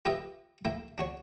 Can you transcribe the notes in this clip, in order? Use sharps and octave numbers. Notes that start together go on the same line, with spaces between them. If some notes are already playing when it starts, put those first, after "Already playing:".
F4 G4 B4 D#5 E5 G5
A#3 E4 G5
D4 F#4 C#5